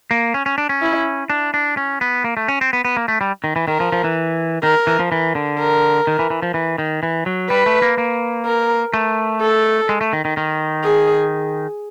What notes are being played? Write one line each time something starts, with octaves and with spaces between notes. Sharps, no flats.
A#3
C#4
C#4
D4
C#4
E4
D4
D4
C#4
B3
A#3
A3
C#4
C4
B3
B3
A#3
A3
G3
D#3
E3
D#3 A#4
F3
F3
E3
D#3 A#4
E3
F3
E3
D3
A#4
D#3
E3
E3
F3
E3
D#3
E3
F#3
G3 B4
A3
A#3
A#3
A#4
A3
A4
G#3
A3
D#3
D#3
D#3
G#4